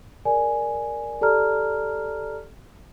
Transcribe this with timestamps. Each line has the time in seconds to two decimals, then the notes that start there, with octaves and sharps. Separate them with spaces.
0.25 G#4 A#4 D5 G#5
1.21 G4 A4 D5 A5 A#5 F6